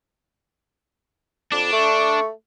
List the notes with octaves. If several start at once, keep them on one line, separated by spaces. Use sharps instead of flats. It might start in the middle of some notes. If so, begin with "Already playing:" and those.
F2 D4
A3 C#6